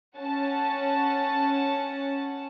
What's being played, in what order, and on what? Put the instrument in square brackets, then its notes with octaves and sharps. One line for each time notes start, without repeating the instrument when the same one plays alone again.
[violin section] C#4 F#5 A5